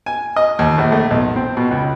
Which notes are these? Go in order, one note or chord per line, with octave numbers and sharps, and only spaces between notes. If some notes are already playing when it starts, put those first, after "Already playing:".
G#5
D#5
D#2
A#1
A3
B1
C4
B2
C#2